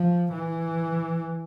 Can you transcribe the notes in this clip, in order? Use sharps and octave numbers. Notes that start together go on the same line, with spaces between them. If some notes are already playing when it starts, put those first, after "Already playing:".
Already playing: F3
E3